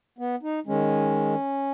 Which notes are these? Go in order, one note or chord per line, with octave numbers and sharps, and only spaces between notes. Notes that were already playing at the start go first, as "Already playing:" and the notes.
B3
D#4
D#3 G#3 C#4